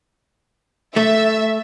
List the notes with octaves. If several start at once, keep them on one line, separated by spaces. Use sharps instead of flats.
A3 E5